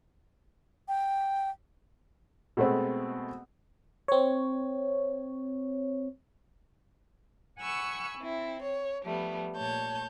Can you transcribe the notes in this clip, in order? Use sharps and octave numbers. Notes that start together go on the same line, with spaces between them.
G5
B2 G#3 A3 B3 C4
C4 C#5
F#5 G#5 B5 C#6 E6
C4 E4
C#5
F3 G3 A3 B3
A#2 A3 C#5 A5 G6